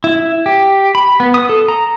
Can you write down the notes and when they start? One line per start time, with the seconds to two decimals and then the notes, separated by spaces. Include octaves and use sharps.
0.04 E4
0.46 G4
0.95 B5
1.20 B3
1.34 D#6
1.49 A4
1.68 A#5